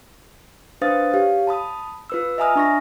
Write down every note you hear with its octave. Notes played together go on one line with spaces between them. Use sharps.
D4 B4 C5 F5 D#6 A6
G4 C#5 F5
A5 B5 D#6
F4 B4 E6
D#5 E5 G#5 A#5 D#6 F6
D4 C#6 A#6